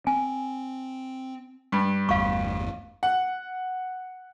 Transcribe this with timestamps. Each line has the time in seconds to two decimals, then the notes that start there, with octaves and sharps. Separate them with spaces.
0.07 C4 G#5
1.72 G2
2.09 G1 E2 A3 F5 C#6
3.03 F#5